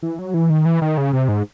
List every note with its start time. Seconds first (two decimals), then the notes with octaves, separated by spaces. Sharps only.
0.03 E3
0.19 F#3
0.34 E3
0.50 D#3
0.65 E3
0.82 D#3
0.98 C#3
1.13 C3
1.29 G#2